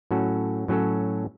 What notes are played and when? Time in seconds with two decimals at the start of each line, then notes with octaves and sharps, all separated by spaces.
0.11 A2 F#3 C#4 F#4 A4
0.68 A2 F#3 C#4 F#4 A4